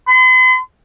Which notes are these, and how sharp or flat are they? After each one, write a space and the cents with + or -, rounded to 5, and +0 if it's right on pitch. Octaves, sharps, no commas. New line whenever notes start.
C6 -45